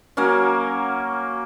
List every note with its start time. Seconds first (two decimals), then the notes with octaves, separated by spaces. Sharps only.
0.17 F#3 A#3 C#4